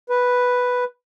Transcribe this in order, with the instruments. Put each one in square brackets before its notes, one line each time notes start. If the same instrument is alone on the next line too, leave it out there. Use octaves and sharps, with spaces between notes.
[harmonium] B4